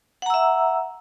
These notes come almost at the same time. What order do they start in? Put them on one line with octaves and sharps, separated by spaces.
F#5 A#5 E6 E5